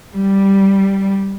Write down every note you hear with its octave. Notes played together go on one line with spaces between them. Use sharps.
G3